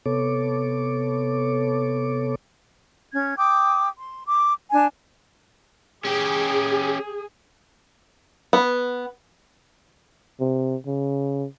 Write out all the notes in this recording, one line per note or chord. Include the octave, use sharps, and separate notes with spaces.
C3 B3 A4 C#5 D6
C#4 G#6
G5 D6 D#6
C6
D6
D4 G#5
C#4 G4 G#4
B3
C3
C#3